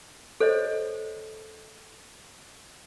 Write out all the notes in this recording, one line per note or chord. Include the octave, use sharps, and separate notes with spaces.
A4 C5 C#5 D#5